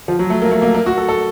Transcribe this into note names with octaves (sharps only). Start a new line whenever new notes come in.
F3
F#3
A3
A#3
A3
A#3
A#3
F#4
A4
A4